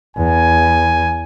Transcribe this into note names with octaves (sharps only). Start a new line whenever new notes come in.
E2 G#5